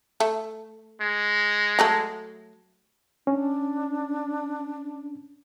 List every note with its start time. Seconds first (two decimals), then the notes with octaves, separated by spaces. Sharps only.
0.20 A3
1.01 G#3
1.79 F#3 A3 A4
3.27 C#4 D4